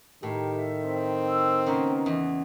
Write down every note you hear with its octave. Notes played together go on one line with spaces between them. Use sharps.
A2 D#3 G4 A#4
E5
C4
E6
C#3 A#3 B3 A#4
E2 D#5